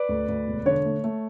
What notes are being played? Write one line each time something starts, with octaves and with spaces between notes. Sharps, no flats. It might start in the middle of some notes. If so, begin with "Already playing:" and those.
Already playing: B4 D5
D2
D2
E1
D3 C#5
A3
A3